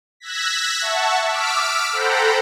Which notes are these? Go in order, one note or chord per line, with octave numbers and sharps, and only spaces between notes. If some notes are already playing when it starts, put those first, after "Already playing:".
E6 F#6 G#6 A#6 B6
E5 F#5 A5 C#6
D6 E6 F6 B6 D7
A4 C5 F#5 G5 A#5 B5